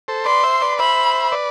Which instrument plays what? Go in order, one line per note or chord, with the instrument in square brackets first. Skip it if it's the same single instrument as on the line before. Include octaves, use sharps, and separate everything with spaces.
[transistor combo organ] A4 C5
[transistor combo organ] B4 D5 [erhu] C6
[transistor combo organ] C5 E5
B4 D5
[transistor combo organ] C5 E5 [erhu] B5
[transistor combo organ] B4 D5